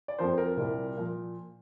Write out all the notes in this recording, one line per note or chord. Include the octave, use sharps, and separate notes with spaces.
D5
F2 F3 A#3 C5
A#4
C2 A#2 G3 A#3
A#2 F3